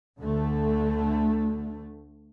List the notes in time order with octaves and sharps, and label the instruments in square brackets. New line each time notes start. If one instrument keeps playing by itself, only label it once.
[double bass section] D2 D3 A3